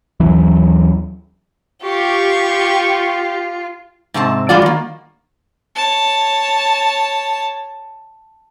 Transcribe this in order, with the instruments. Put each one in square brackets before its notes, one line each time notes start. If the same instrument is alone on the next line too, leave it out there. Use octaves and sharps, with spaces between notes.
[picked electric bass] D#2 E3 F#3 C#4
[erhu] F4 [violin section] G4 [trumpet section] C#6
[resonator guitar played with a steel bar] G#2 C3 C4 A5
G3 G#3 F4 F#4 D5
D#3 A#3
[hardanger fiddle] C#5 A5